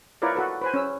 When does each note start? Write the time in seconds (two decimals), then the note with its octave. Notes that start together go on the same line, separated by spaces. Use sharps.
0.22 E4 F4 A#4 B4 C#5 D5
0.35 F#4 A4 B4
0.61 B4 C5 G#5
0.74 C#4 E6